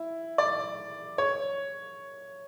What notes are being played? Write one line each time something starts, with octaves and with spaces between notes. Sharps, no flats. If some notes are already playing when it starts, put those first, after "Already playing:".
Already playing: E4
D5
C#5